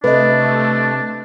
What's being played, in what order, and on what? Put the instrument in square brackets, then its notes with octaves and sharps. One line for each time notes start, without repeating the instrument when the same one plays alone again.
[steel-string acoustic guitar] C3 [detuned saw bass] A3 [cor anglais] D4 [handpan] B4 D#5